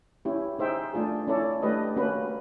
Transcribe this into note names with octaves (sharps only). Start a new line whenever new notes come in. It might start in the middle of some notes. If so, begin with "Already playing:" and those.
C#4 E4 G4
D#4 G#4 C5 E5 G5
A3 D4 F4 G#4
C#4 E4 A4 D5
A3 D4 G4 B4 D#5
A#3 C#4 F#4 B4